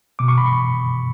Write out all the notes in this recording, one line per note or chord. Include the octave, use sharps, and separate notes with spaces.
B2 D6
C#6
B5
C#6